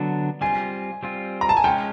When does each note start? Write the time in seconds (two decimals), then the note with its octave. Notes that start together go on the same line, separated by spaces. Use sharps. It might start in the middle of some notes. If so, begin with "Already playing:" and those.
Already playing: D3 F#3 B3 D4
0.41 G3 C4 F4 G#5
1.03 G3 C4 F4
1.41 A#5
1.49 A5
1.57 G#5
1.64 G#3 C#4 F4 G5